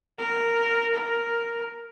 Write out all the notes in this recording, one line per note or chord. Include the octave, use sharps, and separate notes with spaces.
A#4
A#4